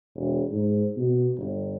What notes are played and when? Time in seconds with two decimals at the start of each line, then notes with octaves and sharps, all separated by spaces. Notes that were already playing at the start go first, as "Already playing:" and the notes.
0.15 E1
0.52 G#2
0.97 B2
1.38 G1